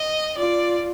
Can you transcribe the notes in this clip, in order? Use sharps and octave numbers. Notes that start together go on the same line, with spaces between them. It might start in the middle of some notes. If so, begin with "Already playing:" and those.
Already playing: D#5
F4 D5